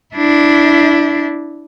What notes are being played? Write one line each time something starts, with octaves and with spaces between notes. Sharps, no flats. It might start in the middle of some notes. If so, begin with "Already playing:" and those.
D4 E4